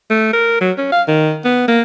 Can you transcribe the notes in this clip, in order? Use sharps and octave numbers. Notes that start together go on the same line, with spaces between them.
A3
A#4
F#3
C#4
F5
D#3
B3
A#3